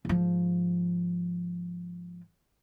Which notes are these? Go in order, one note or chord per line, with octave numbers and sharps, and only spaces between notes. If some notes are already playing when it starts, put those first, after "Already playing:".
G#2 F3